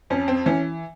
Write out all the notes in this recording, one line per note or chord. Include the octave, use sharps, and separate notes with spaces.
F2 C#4
C4
E3 C#4